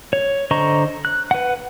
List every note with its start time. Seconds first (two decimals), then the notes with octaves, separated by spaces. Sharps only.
0.13 C#5
0.51 D3 C5 D#5 A#5 C#6
1.05 F#6
1.31 B4 F#5